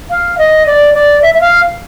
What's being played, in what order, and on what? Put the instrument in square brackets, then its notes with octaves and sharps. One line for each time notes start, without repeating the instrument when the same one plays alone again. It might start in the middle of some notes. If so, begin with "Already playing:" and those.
[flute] F5
D#5
D5
D5
E5
E5
F5